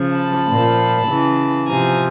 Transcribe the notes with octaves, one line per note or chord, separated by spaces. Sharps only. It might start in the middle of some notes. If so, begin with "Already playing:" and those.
Already playing: C#3 F3
A5 B5
A#2 F3
C#3 E3
C3 F3 G#5 A#5